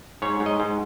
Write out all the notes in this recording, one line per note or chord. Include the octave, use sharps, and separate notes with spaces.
G#2 C#5
G#2
D#5
G#2